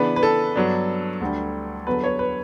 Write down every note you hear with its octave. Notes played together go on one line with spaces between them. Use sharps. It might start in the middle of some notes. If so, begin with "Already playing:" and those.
Already playing: C#3 E3 B3 D4 B4
B4
A4
G2 F#3 B3 D4
D2 D3 G3
E2 D3 F#3 B3 D4 B4
C#5
B4